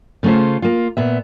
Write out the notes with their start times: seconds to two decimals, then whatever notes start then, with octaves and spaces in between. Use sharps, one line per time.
0.23 C#3 A3 C#4 F4 C5
0.62 A#3 F4
0.97 A#2 B3 E5